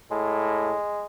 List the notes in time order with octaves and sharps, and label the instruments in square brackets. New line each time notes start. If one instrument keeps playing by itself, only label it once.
[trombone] A2 [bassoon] G#3